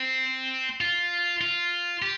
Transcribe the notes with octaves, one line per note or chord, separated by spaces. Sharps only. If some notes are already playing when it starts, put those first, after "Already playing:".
Already playing: C4
F4
F4
G4